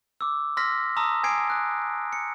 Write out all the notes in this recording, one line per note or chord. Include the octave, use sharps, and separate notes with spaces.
D6 E6
C6 E6 F6 A#6 B6
A5 A#5 C6 D#6 E6
G#5 D#6 G#6 C7 D7
F#6
C#7